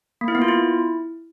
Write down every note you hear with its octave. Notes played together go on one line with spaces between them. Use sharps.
A#3
E4
B3
F4
E4